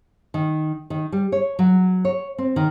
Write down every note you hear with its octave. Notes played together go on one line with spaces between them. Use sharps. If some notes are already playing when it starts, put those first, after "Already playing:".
D#3
D#3
G3
C#5
F#3
C#5
C4
D#3